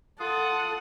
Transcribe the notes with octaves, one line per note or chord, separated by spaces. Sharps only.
F4 A4 F#5 D#6